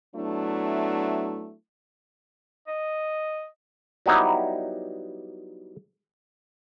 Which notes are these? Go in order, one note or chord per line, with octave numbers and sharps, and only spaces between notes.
F#3 A3 B3 D4 E4
D#5
F#3 G3 B3 D#4 E4 G4